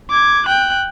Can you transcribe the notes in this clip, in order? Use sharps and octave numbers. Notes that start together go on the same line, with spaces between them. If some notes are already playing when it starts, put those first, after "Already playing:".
D6 G#6
G5 F#6